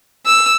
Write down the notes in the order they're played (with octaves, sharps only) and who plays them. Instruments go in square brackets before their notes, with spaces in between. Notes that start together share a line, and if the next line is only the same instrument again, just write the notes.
[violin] E6